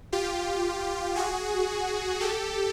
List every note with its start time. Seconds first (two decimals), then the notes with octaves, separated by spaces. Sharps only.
0.12 F4 G4
1.16 F#4 G#4
2.21 G4 A4